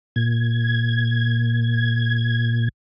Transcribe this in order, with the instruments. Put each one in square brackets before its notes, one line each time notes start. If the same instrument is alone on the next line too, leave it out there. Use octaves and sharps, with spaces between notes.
[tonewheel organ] A#2 G#6